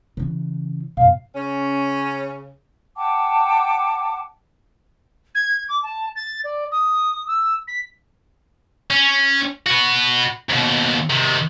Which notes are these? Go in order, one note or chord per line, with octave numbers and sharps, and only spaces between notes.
C#3 E3
F#2 B2 F5
C#3 C#4
F#5 G5 A5 D6
G#6
D6
A5
A6
D5
D#6
E6
B6
C#4
F#4 B4
D#2 B2
C3 D#3